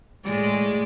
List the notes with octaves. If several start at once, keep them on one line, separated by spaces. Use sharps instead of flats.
A2 G#3 D5